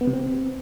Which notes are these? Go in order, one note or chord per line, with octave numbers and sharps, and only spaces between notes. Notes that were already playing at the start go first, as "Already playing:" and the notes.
B3
C3
C4